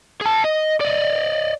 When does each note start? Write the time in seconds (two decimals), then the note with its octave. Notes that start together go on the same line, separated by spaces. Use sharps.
0.21 G#4 A5
0.44 D#5
0.81 D5 D#5